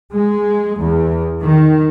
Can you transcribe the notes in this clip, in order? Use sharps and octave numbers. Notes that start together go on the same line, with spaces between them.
G#3
E2
D#3